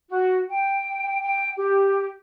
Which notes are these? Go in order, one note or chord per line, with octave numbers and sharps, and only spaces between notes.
F#4
G5
G5
G4